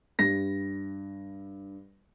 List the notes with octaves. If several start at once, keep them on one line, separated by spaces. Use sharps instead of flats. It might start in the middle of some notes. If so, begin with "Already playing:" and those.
G2 G3 A#6